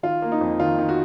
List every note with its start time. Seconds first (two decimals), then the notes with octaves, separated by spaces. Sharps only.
0.03 D#3 F4
0.22 A#3
0.32 D#4
0.41 F2
0.60 D#3 F4
0.79 D#3
0.89 F#4